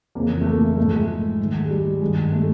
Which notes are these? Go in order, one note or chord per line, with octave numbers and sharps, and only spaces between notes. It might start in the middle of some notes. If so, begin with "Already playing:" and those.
F2 C#3 E3 A#3
A3
A#3
G#2 F3 A3
G#3
G#2 D#3
G#3
G3
G2 D#3 G#3
A3